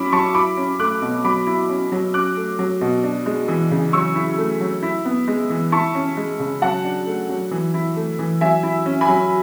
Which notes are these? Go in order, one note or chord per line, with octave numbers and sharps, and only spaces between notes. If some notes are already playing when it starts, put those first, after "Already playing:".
Already playing: F#3 C#4 E4 B5 D6
F#3 A5 C#6
E4 B5 D6
C#4
A3 D6 F#6
B2
F#3 B5 D6
E4
C#4
F#3
C#4 D6 F#6
A3
F#3
B2
D4
G#3
E3
C#3
F#3 C#6 E6
E4
A3
F#3
E4
B3
G#3
E3
E4 A5 C#6
C#4
G#3
C#3
F#3 F#5 A5
D4
A3
F#3
E3
E4
A3
E3
F#3 E5 G#5
E4
C#4
G#5 B5
F#3